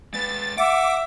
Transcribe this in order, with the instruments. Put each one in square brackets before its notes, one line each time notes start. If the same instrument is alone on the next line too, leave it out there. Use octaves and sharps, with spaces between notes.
[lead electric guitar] G#3 B4 [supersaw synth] A6
[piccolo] E5 [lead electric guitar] F#5 [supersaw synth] D6